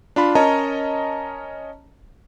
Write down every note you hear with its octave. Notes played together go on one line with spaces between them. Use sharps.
D4 F4 B5
C#4 A#4 C#5 D#5 A5 A#5